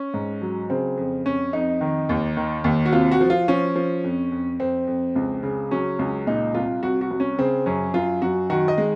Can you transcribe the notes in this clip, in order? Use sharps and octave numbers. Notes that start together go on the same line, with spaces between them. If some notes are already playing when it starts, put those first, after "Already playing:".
Already playing: C#4
G#2
F#3
C#3 C4
F2
F2 C#4
F2 D#4
D#3
D#2
D#3
D#2
F#4
C3 F4
F#4
F3
F4
F3 C#4
F3
F2
F2
F2 C4
F2
C#2
C#3
F#3 C#4
C#2
A#2 D#4
C2 F4
C2 F#4
F#4
C2
C#4
C#3 C4
F#2 C#4
F#2 F4
F#2 F#4
D#3 F#4
D#5
G#3